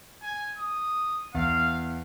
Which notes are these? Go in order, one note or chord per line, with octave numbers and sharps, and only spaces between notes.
G#5
D#6
E2 F5